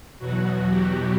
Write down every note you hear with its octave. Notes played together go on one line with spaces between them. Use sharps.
E2 B2 F#3 F#4
G4